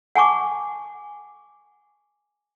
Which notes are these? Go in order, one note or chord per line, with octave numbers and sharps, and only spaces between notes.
F#5 G#5 A5 C#6 D6